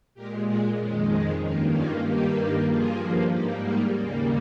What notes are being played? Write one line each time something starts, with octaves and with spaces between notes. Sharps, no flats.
A#2 G#3 G4 A#4
F4 G#4
F2 D#3 G#3 C#4
D#4
G2 D#3 A#3 C#4 F4
C#4 F4
G2 D#3 G3 A#3 D#4 G4
G2 F3 A#3 F4 G#4
G#2 G3 A#3 D#4 G4
D#4
D#2 C#3 G3 A#3 C#4